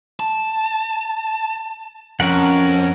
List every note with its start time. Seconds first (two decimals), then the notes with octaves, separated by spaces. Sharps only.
0.20 A5
2.20 F2 C#4 A#4 F#5